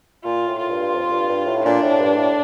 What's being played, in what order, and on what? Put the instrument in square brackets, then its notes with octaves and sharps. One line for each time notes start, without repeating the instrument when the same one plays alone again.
[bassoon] A#2 [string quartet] F4
[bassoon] A2
[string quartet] F4
[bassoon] G2
F2
G2
G2
A2
[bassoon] A#2 [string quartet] D4
[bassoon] A2
G2
A2